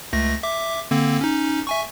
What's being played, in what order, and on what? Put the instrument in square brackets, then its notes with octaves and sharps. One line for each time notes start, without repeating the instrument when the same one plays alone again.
[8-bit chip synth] C#2 A3 A#6
E5 D6
D3 A#3 C4
C#4 D#4
E5 G#5 C#6